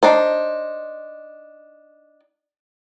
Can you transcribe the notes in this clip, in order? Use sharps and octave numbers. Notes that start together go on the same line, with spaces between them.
D4 D#4 C5